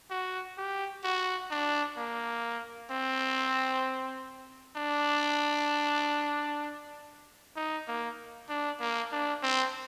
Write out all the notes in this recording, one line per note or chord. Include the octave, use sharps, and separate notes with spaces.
F#4
G4
F#4
D4
A#3
C4
D4
D#4
A#3
D4
A#3
D4
C4